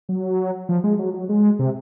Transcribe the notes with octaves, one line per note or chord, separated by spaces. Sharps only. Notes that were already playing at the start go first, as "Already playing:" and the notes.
F#3
F3
G#3
F#3
F#3
G#3
C3